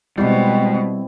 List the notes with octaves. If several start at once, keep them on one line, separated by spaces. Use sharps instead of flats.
B2 G3 G#3 C4 E4